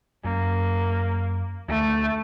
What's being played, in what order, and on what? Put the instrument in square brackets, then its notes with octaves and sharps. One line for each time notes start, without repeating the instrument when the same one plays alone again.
[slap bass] F#2 [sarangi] A#3
[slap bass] D2 [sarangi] A3